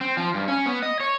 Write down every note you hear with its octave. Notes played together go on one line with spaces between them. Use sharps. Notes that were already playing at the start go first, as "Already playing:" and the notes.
C4
F3
G2
C#4
B3
D#5
C#5